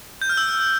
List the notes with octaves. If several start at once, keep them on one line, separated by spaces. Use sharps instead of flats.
G6
F6
E6